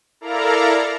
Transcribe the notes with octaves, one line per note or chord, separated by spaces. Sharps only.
E4 A4 A#4 D5 F5 A#5